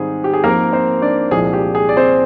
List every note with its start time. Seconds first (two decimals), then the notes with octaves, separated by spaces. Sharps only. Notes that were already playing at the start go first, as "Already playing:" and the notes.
Already playing: G#2 D#3 G3 C4 G#4
0.24 G4
0.33 G#4
0.44 G#2 F3 A#3 C4 A#4
0.73 C4 C5
1.02 D4 D5
1.31 C2 A#2 F3 G#3 C4 G#4
1.53 G4
1.75 G#4
1.89 D5
1.97 C4 C5